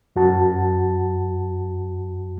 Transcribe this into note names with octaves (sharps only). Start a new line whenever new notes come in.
F#2 F#4 A5